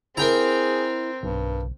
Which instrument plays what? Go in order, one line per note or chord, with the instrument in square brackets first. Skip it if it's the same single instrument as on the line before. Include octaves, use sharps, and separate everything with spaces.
[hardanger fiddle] C4 [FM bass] E4 [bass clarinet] G#4 [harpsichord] A#4 G5 A#5
[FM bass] B1 [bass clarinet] G2